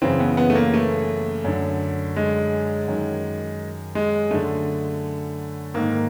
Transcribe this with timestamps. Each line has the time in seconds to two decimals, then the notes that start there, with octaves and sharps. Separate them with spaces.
0.02 F#2 C#3 E3 C4
0.20 B3
0.37 B3
0.50 A3
0.55 A#3
0.74 A3
1.44 F#2 D3
2.16 G#3
2.88 F#2 D#3
3.95 G#3
4.31 F#2 D3 A3
5.74 G#2 D#3 A#3